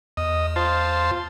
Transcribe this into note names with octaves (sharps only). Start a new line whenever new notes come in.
E2 D#5
F4 C5 A5